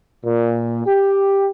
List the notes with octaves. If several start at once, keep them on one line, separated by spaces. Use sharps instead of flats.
A#2
G4